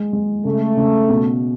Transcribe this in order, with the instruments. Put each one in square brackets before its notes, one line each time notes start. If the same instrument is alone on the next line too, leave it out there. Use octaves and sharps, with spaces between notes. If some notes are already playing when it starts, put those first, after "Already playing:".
Already playing: [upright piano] G#3
G#3
[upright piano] C#3 [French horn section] A3
[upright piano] C#3
B2